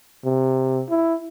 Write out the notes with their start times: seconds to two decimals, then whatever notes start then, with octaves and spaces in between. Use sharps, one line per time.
0.24 C3
0.90 E4